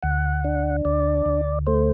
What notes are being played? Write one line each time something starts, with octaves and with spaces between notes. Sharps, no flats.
D2 F#5
D4
D2 D5
D2
A3 C5